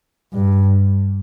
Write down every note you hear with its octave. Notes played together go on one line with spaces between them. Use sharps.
G2